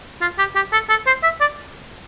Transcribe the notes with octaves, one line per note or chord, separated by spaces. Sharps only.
F4
G4
G4
A4
A4
C5
E5
D5